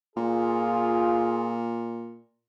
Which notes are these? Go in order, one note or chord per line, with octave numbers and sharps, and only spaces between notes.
A#2 F4 G#4